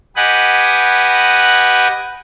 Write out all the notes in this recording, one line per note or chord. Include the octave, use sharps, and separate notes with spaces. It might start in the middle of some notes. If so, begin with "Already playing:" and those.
G4 B4 D#5 F#5 G#5 F#6